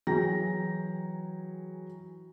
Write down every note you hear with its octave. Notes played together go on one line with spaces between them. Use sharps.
E3 F#3 G#4 G5 A#5 A#6